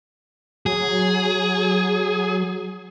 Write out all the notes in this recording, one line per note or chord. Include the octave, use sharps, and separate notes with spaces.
F#3 G#4